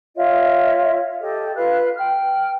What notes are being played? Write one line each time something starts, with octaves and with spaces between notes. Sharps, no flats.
F4 C#5 D#5 E5
G4 A4 D#5
F4 B4 F5 F#6
G5 F6